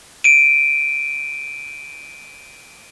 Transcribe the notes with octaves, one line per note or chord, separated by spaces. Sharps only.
D7 D#7